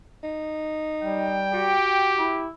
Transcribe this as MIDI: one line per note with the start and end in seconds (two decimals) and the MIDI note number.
0.23 1.48 63
1.03 1.76 55
1.03 2.24 79
1.54 2.35 66
1.54 2.47 67
2.18 2.48 64